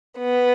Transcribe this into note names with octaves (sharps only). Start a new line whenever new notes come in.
B3